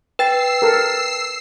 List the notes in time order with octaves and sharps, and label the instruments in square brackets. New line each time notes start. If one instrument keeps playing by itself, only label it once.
[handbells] B4 G5 A6 [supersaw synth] E6 C7
[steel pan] A4 A#4